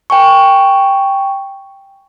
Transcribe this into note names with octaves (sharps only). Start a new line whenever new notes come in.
G5 G#5 C#6